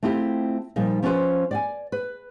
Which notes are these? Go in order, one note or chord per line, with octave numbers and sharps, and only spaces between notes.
A3 C4 E4 F4 G4
A#2 F3 G3 D#4
F3 C#4 F4 A4 B4 C5
D5 G5 G#5
B4